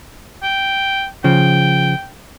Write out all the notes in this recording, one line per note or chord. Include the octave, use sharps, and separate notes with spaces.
G5
C#3 F3 G5